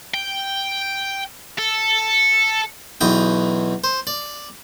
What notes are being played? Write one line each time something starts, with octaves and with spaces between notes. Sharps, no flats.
G5
A4
B1 E2 D#5 G5
C5
D5